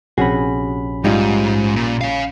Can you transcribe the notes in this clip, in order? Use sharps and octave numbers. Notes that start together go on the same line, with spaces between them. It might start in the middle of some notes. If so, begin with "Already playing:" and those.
A#1 C3 C#4 F#4 G#4 B5
G#2 G3 D#4 F4
A#2
C#5 F5